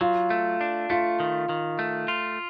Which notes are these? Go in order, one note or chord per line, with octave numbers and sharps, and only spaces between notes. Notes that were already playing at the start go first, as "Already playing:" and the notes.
F#3 F4
A3
D4
A3 F4
D#3
D#3
A3
F4